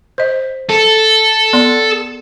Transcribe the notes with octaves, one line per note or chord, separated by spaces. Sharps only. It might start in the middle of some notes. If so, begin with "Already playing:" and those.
C5 D#5
A4
B3 D5 C6